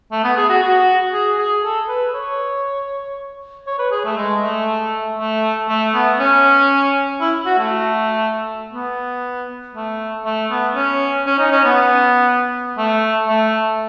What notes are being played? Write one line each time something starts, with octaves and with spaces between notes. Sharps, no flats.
A3
B3
G#4
F#4
F#4
G#4
G#4
A4
B4
C#5
C#5
B4
G#4
A3
G#3
A3
A3
A3
B3
C#4
E4
F#4
A3
B3
A3
A3
B3
C#4
C#4
D#4
C#4
B3
A3
A3